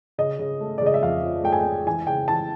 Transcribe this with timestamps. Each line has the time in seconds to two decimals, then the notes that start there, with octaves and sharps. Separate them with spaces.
0.18 C#3 D#5
0.39 C#3
0.61 A3
0.78 D5
0.81 C#3
0.86 D#5
0.94 E5
1.02 F2 F5
1.23 F3
1.44 A3 G5
1.52 G#5
1.60 G5
1.66 A3
1.86 E3 G#5
2.07 C#3 G5
2.28 E3 A5